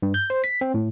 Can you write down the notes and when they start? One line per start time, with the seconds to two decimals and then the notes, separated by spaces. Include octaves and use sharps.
0.02 G2
0.14 G6
0.30 C5
0.44 B6
0.61 C4
0.74 A2